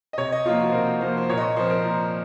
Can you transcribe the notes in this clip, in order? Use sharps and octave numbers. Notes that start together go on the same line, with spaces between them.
D#5
C3 C#5
D#5
F3 A#3 D#4 F4
F#4
C5
C3 A#4
F3 A#3 D#4 C5
C5
A#2 C#5
D#5
C#5
F3 C4 C5
C5
A#4
A#2